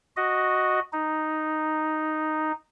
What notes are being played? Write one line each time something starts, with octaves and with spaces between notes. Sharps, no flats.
F#4 D#5
D#4